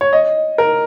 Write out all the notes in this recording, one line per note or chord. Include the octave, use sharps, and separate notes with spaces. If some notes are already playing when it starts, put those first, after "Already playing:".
C#5
D#5
A#4